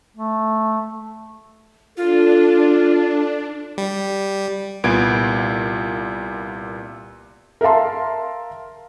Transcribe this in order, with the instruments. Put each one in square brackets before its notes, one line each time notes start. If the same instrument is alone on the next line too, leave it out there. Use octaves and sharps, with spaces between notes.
[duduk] A3
[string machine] D4 [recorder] F4 [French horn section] A4
[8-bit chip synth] G3
[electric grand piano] C2 A#2 B3 G#6 D7
[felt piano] A#4 E5 F5 A5 C6